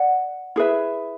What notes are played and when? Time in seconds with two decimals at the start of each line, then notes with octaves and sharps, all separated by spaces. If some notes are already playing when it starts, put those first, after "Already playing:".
Already playing: D5 F#5
0.56 E4 G#4 B4 E5